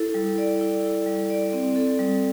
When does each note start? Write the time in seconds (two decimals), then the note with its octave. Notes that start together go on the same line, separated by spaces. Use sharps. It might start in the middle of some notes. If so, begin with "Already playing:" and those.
Already playing: E4 A4
0.14 G3
0.38 D5
0.61 E4
0.84 A4
1.06 G3
1.30 D5
1.53 C4
1.76 A4
1.99 G3